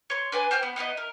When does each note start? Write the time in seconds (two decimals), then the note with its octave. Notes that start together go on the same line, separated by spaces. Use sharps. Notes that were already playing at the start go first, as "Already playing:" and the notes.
0.10 C#5 C6
0.32 D4 B4 G#5
0.51 C5 G5 F6 G6
0.63 B3
0.76 B3 D#4 E4 D#5
0.97 A#4